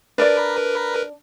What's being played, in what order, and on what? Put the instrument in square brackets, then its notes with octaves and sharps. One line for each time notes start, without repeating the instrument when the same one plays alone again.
[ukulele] D4 D5 [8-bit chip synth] A#4 B4